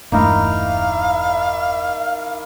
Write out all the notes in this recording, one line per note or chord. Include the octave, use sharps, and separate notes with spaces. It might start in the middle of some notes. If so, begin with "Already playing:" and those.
E1 G2 A3 A#3 D#4 E4 F5